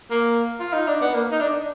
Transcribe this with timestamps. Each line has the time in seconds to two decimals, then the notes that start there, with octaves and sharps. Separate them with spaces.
0.10 A#3
0.60 F4
0.73 D#4
0.87 D4
1.01 B3
1.14 A#3
1.31 D#4
1.40 D4